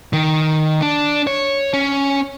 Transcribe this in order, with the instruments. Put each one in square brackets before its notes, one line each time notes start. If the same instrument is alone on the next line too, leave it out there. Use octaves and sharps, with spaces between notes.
[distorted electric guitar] D#3
D4
C#5
C#4